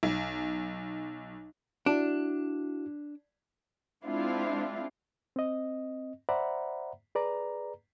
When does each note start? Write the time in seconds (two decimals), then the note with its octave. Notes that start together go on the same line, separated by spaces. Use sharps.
0.03 B1
1.86 D4 E4 F#4
4.05 G#3 C4 D4 E4 F4
5.36 C4 D#5
6.29 C5 D5 E5 F#5 A#5 B5
7.15 G#4 B4 D5 A#5